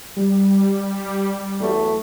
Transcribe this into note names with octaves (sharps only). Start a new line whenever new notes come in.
G3
E2 F#3 A3